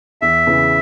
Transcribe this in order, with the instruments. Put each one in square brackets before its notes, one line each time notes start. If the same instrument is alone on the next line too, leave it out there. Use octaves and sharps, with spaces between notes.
[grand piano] E2 [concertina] E5
[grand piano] C#3 E3 B3